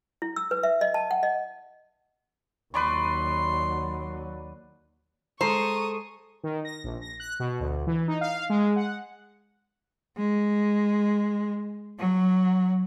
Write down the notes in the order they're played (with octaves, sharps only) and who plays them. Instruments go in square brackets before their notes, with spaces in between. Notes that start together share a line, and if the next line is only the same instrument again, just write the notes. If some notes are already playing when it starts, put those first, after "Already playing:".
[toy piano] E4
E6
B4
E5
D#5
A5
F#5
D#5
[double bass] D#2 F#3 [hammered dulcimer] B4 D5 C#6 [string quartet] C6
[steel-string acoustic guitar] G#3 A4 [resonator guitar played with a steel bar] C5 [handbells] A#5 [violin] C#6 D#6
[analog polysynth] D#3
A#6
A#1
A#6
F#6
B2
D2
E3
D#4
F5
G#3
F#5
[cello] G#3
F#3